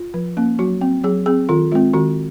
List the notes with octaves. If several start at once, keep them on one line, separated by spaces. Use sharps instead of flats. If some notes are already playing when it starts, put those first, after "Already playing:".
Already playing: F4
F3
A#3 C#4
F#3 F#4
C4
F#3 G#4
C4 G#4
D#3 F4
G#3 C4 F4
D#3 F#4